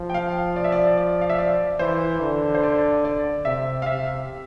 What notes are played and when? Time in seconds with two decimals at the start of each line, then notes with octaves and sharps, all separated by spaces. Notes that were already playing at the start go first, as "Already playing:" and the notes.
Already playing: F3
0.10 G5
0.14 F5
0.56 D5
0.64 E5
0.72 D5
0.98 D5
1.21 F5
1.30 E5
1.39 D5
1.79 E3 C5
2.21 D3
2.55 C5
2.63 D5
3.05 D5
3.45 C3 E5
3.82 F5
3.86 C3 E5